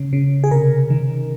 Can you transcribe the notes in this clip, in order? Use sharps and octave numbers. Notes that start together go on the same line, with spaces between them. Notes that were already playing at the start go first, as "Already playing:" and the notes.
Already playing: C#3
C#3
G#4
C3 A#4
D#3